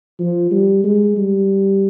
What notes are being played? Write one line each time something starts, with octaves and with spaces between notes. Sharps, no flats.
F3
G3
G#3
G3